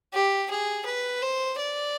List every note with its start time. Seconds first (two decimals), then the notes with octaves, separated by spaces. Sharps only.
0.13 G4
0.50 G#4
0.86 B4
1.22 C5
1.58 D5